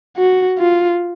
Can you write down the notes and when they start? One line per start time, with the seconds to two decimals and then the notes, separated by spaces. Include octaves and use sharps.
0.18 F#4
0.59 F4